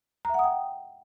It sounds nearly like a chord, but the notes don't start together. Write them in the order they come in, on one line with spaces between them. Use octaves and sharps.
A#5 E5 F#5 D#6 G5